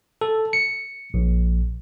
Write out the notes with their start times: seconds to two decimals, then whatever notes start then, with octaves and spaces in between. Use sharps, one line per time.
0.21 A4
0.53 C#7
1.14 A#1